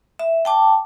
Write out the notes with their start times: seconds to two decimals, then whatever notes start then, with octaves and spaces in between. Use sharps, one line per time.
0.19 E5
0.45 G5 A5 D6